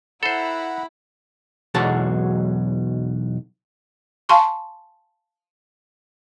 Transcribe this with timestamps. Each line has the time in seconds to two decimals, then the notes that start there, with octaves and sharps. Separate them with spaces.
0.23 E4 A4 C5 F#5 A#5 B5
1.74 B1 E2 B2 F#3 G#3 A5
4.29 F5 G#5 A5 C6 C#6